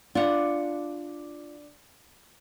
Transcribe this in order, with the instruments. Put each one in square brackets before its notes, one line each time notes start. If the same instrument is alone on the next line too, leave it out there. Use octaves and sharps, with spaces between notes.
[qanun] D4 F#5 [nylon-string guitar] F4